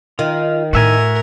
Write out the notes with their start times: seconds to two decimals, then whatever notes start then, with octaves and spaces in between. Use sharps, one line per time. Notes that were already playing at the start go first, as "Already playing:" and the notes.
0.19 D#3 F4
0.73 A2 A3 F#4 A#4 E5 G#5